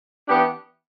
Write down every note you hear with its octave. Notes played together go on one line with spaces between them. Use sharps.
E3 B3 D4 G4